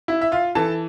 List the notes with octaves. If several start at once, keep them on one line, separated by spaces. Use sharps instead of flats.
E4 E5
E5
F4 F5
E3 A4 A5